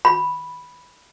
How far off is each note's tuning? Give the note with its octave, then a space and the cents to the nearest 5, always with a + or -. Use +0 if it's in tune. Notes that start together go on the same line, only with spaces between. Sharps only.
B5 -5